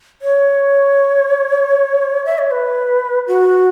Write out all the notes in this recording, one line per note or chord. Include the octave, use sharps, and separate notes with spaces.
C#5
E5
C#5
B4
F#4